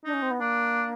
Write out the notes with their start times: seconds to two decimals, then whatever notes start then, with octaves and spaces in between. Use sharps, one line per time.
0.05 D4 D#4
0.13 C#4
0.22 C4
0.31 B3
0.40 A#3 D4